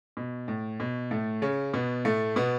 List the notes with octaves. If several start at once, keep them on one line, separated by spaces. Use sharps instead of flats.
B2
A2
B2
A2 A3
C#3 C#4
B2 B3
A2 A3
B2 B3